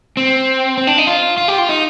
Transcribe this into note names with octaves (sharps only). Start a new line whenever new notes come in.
C4
C4
D4
D#4
F4
F4
G4
F4
D#4